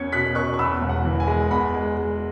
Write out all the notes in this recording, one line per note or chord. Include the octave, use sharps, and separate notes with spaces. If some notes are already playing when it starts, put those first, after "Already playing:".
Already playing: E2 C#4 G#6 C#7
B2 F#6 B6
C#4 C#6 F#6
C#6
E2 B5 E6
E1
F#5
E3
G#5
G#3
E2 F#5 B5
G#3
G#3